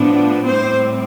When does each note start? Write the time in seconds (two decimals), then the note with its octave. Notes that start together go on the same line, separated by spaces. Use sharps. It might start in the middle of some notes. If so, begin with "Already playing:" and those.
Already playing: A2 F3 B3 D4
0.44 A2 G3 C4 C5